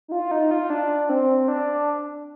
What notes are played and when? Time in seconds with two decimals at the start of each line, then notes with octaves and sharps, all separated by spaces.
0.08 D#4
0.12 F4
0.31 D#4
0.51 F4
0.70 D4
1.09 C4
1.48 D4